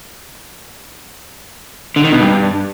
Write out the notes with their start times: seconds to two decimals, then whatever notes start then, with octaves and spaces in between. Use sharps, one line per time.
1.96 D3
2.04 D#3
2.12 B2
2.20 G2